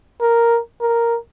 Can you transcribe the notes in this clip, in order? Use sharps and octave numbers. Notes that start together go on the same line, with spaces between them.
A#4
A#4